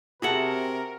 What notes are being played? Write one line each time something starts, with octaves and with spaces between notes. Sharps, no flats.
C3 F#4 G#4 A#4 E5 F#5 A5